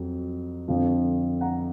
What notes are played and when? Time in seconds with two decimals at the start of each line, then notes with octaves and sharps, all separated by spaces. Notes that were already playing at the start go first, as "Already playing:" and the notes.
Already playing: F2 F#3
0.68 F2 D3 F3
1.41 F#5 A#5